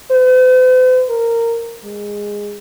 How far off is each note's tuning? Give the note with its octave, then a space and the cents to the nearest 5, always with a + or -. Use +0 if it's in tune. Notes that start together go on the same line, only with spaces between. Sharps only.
C5 -45
A#4 -15
G#3 -15